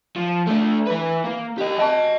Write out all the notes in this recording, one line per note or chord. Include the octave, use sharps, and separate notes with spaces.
F3
A3 D4
E3 B4
A#3
G4 D#5
D#5 A5